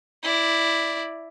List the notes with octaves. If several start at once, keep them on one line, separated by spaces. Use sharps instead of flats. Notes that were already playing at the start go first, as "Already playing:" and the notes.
E4 D5